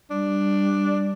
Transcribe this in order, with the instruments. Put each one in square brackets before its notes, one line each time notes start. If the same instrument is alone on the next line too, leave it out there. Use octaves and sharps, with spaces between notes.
[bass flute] G3 [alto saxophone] D4